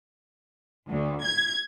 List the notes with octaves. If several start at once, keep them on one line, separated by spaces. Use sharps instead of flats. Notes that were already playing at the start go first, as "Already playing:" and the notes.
D2
G#6